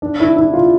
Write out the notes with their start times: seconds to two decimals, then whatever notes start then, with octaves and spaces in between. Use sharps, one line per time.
0.02 D4
0.20 E4
0.36 E4
0.53 F4